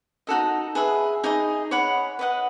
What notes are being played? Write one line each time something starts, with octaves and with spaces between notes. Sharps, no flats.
D#4 F#4 A4 D#5
G#4 B4 E5
D#4 G#4 D#5
C#5 F#5 B5
B4 D#5 F#5